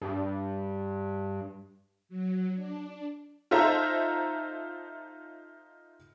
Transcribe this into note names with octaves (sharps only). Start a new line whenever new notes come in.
G2
F#3
D4
D#4 F4 A4 C5 E5 A#5